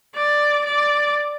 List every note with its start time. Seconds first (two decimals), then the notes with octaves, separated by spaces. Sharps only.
0.15 D5
0.65 D5